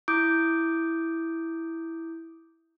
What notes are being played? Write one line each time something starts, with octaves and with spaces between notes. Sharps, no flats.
E4 D6 D#6 G6 D7